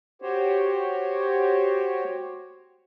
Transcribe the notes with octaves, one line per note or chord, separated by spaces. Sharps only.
F#4 G4 C5 C#5